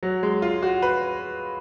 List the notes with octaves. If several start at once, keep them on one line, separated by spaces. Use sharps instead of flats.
F#3
G#3
F4
F#4
B4